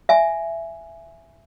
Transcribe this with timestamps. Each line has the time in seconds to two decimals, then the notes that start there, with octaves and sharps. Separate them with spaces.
0.09 E5 G#5